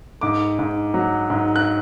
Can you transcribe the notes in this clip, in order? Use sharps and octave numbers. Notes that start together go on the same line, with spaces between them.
G#2 D6
G#2
F#3
G#2
F#6